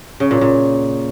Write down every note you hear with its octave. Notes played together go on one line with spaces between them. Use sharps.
C#3
A#2
A#2